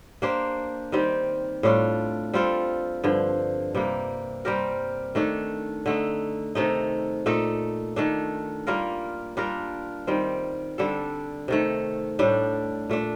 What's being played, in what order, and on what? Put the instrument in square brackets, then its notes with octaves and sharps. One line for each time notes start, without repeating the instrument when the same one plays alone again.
[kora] A#3 D4 G4 C5
D#3 G3 C4 G4
A2 G3 D4 F4
G3 C4 F4 A4
G2 D3 F3
C3 G3 A#3
G3 C4 G4 A#4
D#3 A3 D4
D3 A3 D#4
C3 D#3 A3 D#4
A#2 A3 D#4 A4
D#3 A3 D4
G3 A#3 F4 A#4
G3 D4 F4 A#4
D#3 G3 C4
D3 G3 D4 A4
C3 D#3 A3
A2 G3 D4
A#2 A3 D4